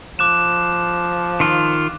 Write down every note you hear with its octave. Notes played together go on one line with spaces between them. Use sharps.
F3 D6 F#6 E7
D#3 F4